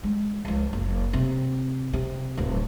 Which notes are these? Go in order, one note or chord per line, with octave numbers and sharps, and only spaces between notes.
G#3
C#2 F3
F#1
C3
C3
D1 D2